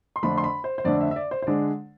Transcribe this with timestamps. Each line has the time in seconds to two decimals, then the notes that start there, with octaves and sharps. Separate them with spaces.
0.16 C6
0.23 F2 D3 A3 D4 B5
0.38 C6
0.44 B5
0.64 C5
0.78 C5
0.85 F2 D3 A3 D4 D5
1.01 E5
1.11 E5
1.16 D5
1.31 C5
1.42 C5
1.47 D3 G#3 D4 D5